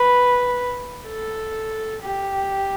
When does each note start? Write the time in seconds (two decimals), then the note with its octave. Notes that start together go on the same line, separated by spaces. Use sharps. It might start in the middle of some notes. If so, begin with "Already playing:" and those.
Already playing: B4
1.07 A4
2.03 G4